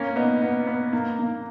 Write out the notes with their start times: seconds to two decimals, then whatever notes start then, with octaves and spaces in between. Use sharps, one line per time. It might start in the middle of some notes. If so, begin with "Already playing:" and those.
Already playing: A#3 C#4
0.16 B3 D#4
0.42 B3
0.67 B3
0.93 A#3
1.19 A#3